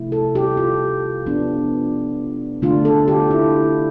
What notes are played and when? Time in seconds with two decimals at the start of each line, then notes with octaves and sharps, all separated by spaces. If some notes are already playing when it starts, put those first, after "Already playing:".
Already playing: C3 F3 A3 E4
0.12 A4
0.35 G4
0.57 F4
1.26 F3 B3 D4
2.62 D3 A3 D4 F4
2.85 A4
3.08 G4
3.31 E4